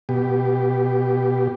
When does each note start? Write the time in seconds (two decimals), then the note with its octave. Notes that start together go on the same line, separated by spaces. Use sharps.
0.09 B2 G4